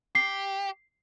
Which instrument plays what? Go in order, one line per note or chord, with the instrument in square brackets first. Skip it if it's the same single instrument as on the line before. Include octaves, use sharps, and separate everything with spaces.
[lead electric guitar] G4 [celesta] C7